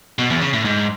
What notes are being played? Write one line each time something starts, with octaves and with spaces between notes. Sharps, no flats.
B2
E2
C#3
A2
G#2